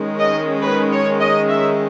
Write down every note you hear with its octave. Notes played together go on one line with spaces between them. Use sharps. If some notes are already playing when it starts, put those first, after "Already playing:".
Already playing: D#3 G#3 C#4
D#5
B4
C#5
D#5
E5